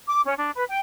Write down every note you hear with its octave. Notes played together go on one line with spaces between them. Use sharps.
D6
C#4
D4
B4
G5